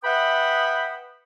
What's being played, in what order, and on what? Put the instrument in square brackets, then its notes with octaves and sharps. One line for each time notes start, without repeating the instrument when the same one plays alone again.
[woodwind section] B4 E5 F#5 G5 B5 D#6